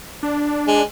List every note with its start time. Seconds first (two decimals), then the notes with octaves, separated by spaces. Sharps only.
0.23 D4
0.68 G#3